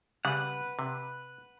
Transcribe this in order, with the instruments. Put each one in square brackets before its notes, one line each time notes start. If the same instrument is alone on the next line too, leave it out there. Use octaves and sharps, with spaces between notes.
[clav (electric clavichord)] C#3 G3 [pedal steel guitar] B4 F#5
[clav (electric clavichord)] C3